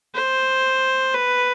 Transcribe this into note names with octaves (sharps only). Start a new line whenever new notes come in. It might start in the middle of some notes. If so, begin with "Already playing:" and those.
C5
B4